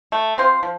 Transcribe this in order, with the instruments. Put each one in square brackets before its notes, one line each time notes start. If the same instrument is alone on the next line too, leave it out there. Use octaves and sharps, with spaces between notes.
[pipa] A3
C4 F4 C5
F3